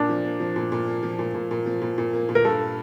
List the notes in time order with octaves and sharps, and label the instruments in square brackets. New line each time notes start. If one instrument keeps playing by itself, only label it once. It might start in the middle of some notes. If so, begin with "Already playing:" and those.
Already playing: [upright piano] A#2 [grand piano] D4
[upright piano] F3
A#3
F3
A#2
A#2
A#3
F3
A#2
A#2
A#2
F3
A#2
A#2
A#3
A#2
[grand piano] A#4
[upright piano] G2 [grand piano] A4